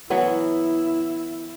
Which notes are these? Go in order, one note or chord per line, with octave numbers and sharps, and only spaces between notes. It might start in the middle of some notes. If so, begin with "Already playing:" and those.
E3 F#3 B3 E4